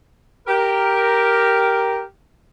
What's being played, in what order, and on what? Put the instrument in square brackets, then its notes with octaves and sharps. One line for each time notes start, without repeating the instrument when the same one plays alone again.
[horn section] G4 A#4